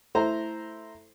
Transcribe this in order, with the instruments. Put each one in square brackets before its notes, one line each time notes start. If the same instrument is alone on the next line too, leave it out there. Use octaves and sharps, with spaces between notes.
[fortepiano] A3 E4 C5 A#5